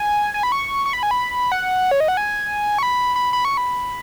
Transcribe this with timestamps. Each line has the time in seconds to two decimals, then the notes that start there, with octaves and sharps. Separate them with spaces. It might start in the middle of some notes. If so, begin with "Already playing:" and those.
Already playing: G#5
0.34 G#5
0.43 B5
0.52 C#6
0.86 C#6
0.93 B5
1.03 G#5
1.11 B5
1.52 F#5
1.91 C#5
2.00 D#5
2.08 F#5
2.17 G#5
2.78 C#6
2.83 B5
3.16 B5
3.33 B5
3.45 C#6
3.57 B5